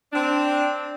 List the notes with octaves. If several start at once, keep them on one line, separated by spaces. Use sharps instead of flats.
C4 D4